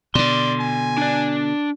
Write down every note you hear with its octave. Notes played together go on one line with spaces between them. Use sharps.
B2 D3 D5 C6
G#5
D4 D5